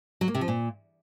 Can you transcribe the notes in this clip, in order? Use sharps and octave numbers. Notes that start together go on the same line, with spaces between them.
F#3
A#3
C3
F3
A#2